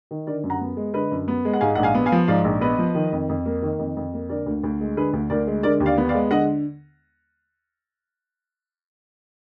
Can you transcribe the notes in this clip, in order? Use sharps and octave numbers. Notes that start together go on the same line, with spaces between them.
D#3
D3 A#4 D5
F#2
F#5 A#5
B3
G#3
D3 B4 D#5
F#2
B3
G#3
F#5
G#2 F5 G#5
A#1 F#5
F5 G#5
B3
F5 G#5
F3
G#2 D5 F5
A#1
B3 B4 D#5
F3
D#3
F2
F2
A#3
D#3
F2
F2
A#3
D3 A#4 D5
D2
D2
G#3
D3 G#4 B4
D2
D2 A#4 D5
G#3
D3 A#4 D5
D#2
D5 F5
B3
D5 F5
G#3
D3 D#5 F#5